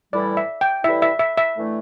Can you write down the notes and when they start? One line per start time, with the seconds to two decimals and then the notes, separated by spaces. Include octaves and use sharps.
0.13 A2 E3 G3 E4 D5
0.37 E5
0.61 G5
0.84 A2 E3 G3 E4 E5
1.02 E5
1.19 E5
1.38 E5
1.55 A2 E3 A3 D4